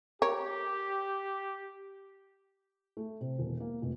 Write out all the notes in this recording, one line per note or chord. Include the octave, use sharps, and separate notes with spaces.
G4 A#4 C#5
A3
C3
E1
A#3
F1